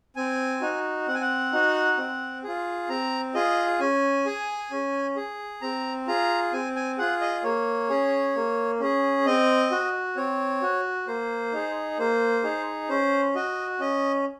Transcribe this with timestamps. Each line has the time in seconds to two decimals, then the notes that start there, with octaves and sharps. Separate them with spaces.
0.16 C4 G#5
0.62 D#4 F#4
1.07 C4 F#5
1.15 G#5
1.21 F#5
1.52 D#4 F#4
1.98 C4
2.44 F4 G#4
2.89 C4 A#5
3.34 F4 G#4 D#5
3.80 C#4 G#5
4.26 G#4
4.71 C#4
5.16 G#4
5.62 C4 A#5
6.08 F4 G#4 A#5
6.53 C4 G#5
6.76 G#5
6.98 F4 G#4 F#5
7.21 D#5
7.43 A#3 C#5
7.90 C#4 G#4
8.35 A#3
8.80 C#4 G#4
9.26 C4 D#5
9.71 F#4
10.16 C4 C#5
10.62 F#4
11.07 A#3 C5
11.53 D#4 G#4
11.99 A#3 C5
12.44 D#4 G#4
12.89 C#4 C5
13.35 F#4 D#5
13.80 C#4 D#5